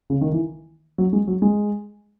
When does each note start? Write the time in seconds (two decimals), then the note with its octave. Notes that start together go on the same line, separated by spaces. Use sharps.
0.10 C#3
0.21 D#3
0.32 E3
0.98 F#3
1.13 G#3
1.27 F#3
1.42 G#3